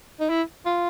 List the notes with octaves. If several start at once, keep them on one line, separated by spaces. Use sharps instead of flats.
D#4
E4
F4